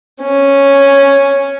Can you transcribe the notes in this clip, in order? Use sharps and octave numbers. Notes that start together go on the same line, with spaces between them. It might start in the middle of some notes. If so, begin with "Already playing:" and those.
C#4